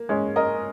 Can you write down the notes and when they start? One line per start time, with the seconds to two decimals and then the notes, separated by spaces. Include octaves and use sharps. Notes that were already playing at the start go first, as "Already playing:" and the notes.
Already playing: A#3
0.09 G#3 C#4
0.36 A#4 D#5